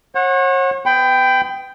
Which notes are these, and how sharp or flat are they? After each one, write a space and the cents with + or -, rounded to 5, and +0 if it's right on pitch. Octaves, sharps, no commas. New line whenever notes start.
C#5 -40 F#5 -15
B3 +25 G5 +0 B5 +35